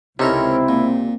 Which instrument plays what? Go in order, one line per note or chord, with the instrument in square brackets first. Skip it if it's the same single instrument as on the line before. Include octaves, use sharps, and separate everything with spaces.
[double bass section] C#2 C4 [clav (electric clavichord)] C3 D#4 [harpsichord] C#4 A4 A#4 [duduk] E4
[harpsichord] A#2